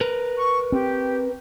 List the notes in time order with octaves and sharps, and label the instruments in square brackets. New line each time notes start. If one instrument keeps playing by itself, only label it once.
[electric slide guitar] A#4 B4
[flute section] C#6
[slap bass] C4 [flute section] G4